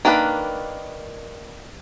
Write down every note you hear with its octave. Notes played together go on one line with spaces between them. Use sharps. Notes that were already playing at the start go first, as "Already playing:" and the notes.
D#3 A#3 D4 F#4 B4